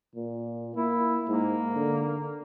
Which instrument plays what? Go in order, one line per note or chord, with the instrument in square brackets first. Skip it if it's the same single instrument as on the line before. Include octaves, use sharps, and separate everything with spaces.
[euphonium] A#2
[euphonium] A#3 [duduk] E4
[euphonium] G#2 [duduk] A#3
[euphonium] D3